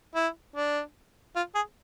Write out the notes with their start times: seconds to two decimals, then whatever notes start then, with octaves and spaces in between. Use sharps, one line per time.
0.15 E4
0.56 D4
1.36 F4
1.55 G#4